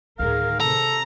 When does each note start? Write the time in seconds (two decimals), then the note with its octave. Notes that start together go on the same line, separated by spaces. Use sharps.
0.19 D2 A2 D#3 G#4 A#4 F5
0.60 C3 A4 A#5